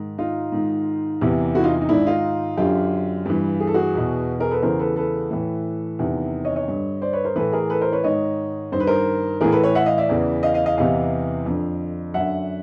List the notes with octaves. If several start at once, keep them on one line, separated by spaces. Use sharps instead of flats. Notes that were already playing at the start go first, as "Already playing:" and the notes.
Already playing: G#2 D#3
D#4 F4
G#2 D#3
E2 C3 E3
E4 F#4
D#4 F4
D#4
G#2 D#3 D4 E4
D#4 F4
F#2 D3 F4 G4
G2 E3
G#4
A4
F#4 G#4
E2 B2
G#4 A#4
A4 B4
E2 C#3 E3 A#4 C5
A4 B4
A4 B4
A2 E3
E2 C3 D#3
C#5 D#5
C#5 D#5
G2 D3
C5 D5
B4 C#5
A#4 C5
A2 E3 A4 B4
G#4 A#4
A4 B4
A#4 C5
B4 C#5
G#2 D#3 C#5 D#5
G2 D#3 C5
B4
A#4 C5
A2 E3 G#4 A#4
A4 B4
B4 C#5
E5 F#5
D#5 F5
D5 E5
E2 C#3 E3
D#5 F5
D#5 F5
D#5 F5
E2 C3 E3 D#5 F5
F2 D3
F#2 D3 E5 F#5